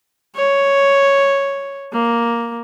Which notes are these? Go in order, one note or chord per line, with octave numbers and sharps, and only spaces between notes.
C#5
A#3